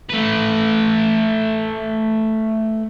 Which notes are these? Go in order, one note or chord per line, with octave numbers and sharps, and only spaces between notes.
A3 B4